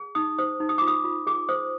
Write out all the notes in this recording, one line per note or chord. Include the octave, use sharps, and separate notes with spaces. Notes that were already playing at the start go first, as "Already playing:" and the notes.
Already playing: G#4
D#4 D#6
C5 D#6
D#4
D#6
F4 D6
D#6
F4
G#4 D6
C5 D#6